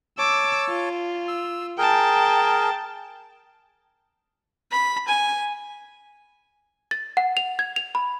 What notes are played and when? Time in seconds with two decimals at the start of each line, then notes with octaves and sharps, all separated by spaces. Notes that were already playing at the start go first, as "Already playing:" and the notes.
0.18 C#5 A5 D6 E6
0.69 F4
1.28 E6
1.78 G#4 A#4 G5 A5
4.71 B5
5.07 G#5
6.91 A6
7.17 F#5
7.37 F7
7.59 G#6
7.76 F7
7.95 B5